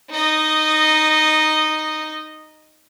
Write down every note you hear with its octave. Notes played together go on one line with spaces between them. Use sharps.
D#4 D#5